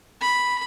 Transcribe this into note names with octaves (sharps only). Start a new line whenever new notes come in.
B5